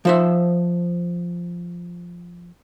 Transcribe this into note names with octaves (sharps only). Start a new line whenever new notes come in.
F3 C5 E5